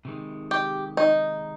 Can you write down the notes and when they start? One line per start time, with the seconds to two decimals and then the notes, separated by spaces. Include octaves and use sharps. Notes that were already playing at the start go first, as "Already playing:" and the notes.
0.05 C3 D#3 G#3
0.51 G4
0.97 D#4